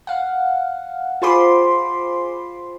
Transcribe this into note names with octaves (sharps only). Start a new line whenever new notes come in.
F5 F#5
F4 G#4 C5 B5 C6 D6